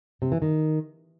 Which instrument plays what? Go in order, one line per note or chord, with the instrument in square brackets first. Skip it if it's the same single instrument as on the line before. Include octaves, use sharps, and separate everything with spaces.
[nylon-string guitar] C3
E3
D#3